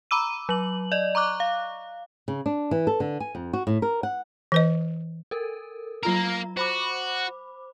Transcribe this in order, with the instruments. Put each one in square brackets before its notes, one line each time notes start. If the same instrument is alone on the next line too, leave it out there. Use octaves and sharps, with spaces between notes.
[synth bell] A#5 B5 D6 E6 D#7
F#3 F#7
D5 D#5
A#5 C#6 D6 F#6
F5
[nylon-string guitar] C#3
D4
E3
A4
D3
G#5
F2
F#4
A2
A#4
F#5
[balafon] E3 B4 D#5
[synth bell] A4 A#4
[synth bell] F#3 F4 A#5 [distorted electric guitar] A#3 A#4
[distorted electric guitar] F#4 [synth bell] C5 B5 D6